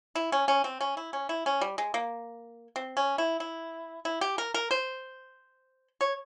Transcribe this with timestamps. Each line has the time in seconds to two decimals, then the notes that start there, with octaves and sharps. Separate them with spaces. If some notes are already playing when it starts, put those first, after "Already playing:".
0.15 E4
0.32 C#4
0.48 C#4
0.64 C4
0.81 C#4
0.97 E4
1.13 C#4
1.29 E4
1.46 C#4
1.61 G3
1.78 G#3
1.94 A#3
2.76 C4
2.97 C#4
3.18 E4
3.40 E4
4.05 E4
4.21 G4
4.38 A#4
4.54 A#4
4.71 C5
6.01 C#5